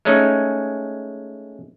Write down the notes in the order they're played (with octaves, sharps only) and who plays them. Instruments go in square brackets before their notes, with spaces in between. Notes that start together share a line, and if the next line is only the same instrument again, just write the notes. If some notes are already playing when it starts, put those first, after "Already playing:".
[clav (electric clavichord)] G#3 A3 C#4 D#4